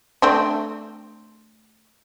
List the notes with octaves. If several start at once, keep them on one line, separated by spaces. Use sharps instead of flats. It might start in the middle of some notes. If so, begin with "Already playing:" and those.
A3 C4 D4